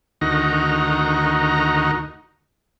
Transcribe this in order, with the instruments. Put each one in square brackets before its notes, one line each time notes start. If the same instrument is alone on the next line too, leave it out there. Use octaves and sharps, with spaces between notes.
[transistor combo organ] D2 D#3 D#4 F#4 A#5